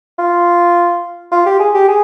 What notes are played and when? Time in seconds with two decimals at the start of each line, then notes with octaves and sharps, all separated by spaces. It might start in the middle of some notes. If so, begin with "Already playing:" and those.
0.19 F4
1.32 F4
1.46 G4
1.60 G#4
1.74 G4
1.88 G#4